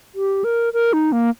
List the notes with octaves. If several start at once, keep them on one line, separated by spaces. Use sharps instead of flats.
G4
A#4
A#4
D#4
A#3